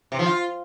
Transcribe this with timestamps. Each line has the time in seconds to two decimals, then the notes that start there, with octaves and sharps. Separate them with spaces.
0.12 C3
0.19 F3
0.26 F4